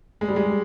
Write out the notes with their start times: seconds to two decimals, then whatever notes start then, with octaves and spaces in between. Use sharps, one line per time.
0.21 G#3
0.28 G3
0.36 G#3